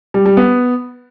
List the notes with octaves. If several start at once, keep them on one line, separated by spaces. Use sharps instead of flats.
G3
G3
B3